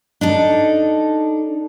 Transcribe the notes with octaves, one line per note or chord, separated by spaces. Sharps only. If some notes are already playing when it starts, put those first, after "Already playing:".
D4 D#4 A4